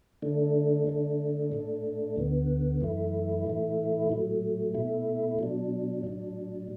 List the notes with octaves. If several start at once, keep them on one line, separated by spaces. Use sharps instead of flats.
D3 A3 D4
D3 A3 D4
A2 A3 D4
D2 D3 B3
F#2 E3 A3 E4
A2 E3 A3 E4
A2 F#3 A3
B2 A3 E4
B2 F#3 D4
A2 F#3 D4